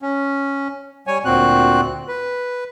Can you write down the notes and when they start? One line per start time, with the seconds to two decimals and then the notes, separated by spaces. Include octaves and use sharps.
0.02 C#4
1.07 G3 C#5 G#5
1.25 D2 A#2 C4 F#4 F#6
2.08 B4